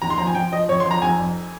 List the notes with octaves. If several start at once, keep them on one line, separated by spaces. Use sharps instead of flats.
D#2 A#5
C6
F3 A#5
G#5
F3 G5
F3 D#5
F2 C#5
C6
F3 A#5
F1 G#5
F2